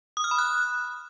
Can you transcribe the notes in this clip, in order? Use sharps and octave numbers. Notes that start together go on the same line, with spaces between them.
D#6
F6
B5
F#6